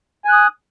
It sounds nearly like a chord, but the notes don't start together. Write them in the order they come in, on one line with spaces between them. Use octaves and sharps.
G#5 F#6 D#6